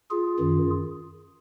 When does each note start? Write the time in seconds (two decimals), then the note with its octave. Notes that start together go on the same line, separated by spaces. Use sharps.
0.11 F4 G#4
0.39 F#2 D#3